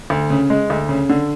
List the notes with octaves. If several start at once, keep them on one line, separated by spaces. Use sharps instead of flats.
D2
C#3
G#3
D2
C#3
D3